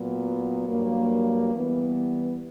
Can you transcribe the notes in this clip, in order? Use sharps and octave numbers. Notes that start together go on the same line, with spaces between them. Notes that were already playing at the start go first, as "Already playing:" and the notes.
Already playing: A#2 F#3 B3
G2 F#3 A#3
E3 G3 B3